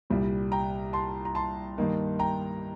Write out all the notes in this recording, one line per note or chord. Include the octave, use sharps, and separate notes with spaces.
C2 A#2 G3
G5 A#5
A5 C6
A#5
A5 C6
G2 D#3 A#3 D#4
G5 A#5